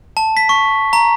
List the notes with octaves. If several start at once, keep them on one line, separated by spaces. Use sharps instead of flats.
A5
B6
C#6
A#5